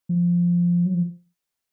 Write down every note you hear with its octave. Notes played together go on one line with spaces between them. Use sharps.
F3
F#3
F3